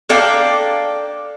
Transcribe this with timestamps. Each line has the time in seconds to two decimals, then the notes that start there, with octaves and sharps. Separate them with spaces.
0.09 A#3 D4 A4 D5 F5 G5